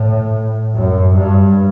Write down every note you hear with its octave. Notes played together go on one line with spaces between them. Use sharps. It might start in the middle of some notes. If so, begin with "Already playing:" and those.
Already playing: A2
F#2
G2